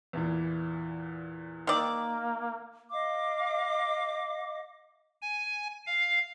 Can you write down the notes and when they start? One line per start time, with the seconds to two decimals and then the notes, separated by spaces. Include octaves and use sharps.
0.13 E2 A#2 E3
1.67 D#3 A#3 D5 G5 A#5 E6
2.92 D#5 F5 D6
5.22 G#5
5.87 F5